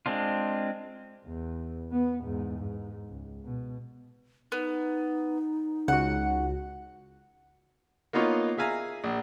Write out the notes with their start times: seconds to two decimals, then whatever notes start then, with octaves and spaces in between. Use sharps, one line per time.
0.06 G#3 C4 D4 F4
1.25 E2
1.92 B3
2.23 E2 G#2
2.59 G#2
3.09 C#2
3.45 B2
4.52 B3 D#4
5.88 C#2 F#4 F#5
8.13 A#3 B3 D#4 F4 C#5
8.57 G#4 E5 F5 G#5 A#5
9.04 A#1